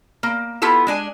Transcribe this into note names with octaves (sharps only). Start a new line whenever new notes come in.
A#3
B3 E4 F4 G4 A4 A5
G#3 D4 G#5